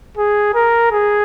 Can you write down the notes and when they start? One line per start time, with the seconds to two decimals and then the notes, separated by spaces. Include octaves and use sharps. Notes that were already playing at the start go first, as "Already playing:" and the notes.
0.17 G#4
0.55 A#4
0.91 G#4